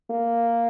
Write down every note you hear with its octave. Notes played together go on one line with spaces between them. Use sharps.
A#3